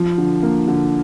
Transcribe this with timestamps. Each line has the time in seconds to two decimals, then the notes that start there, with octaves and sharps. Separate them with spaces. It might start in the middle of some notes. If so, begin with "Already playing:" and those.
Already playing: F3
0.18 D3
0.42 A#3
0.68 D3